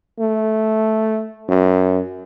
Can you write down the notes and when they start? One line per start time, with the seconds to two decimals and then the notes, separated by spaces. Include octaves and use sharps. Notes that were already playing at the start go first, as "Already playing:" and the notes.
0.20 A3
1.49 F#2